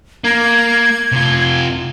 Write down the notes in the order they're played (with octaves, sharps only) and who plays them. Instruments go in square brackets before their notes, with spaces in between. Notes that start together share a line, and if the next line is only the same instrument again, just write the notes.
[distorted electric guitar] A#3 [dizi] G#6
[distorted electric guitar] C3 F4